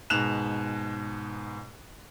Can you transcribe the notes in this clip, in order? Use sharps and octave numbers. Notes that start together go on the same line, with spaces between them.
G#2 B2 F#6 E7 F7